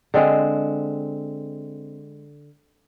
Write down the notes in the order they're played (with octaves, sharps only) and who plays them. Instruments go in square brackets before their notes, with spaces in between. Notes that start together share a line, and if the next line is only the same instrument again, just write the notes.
[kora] D3 G#3 C4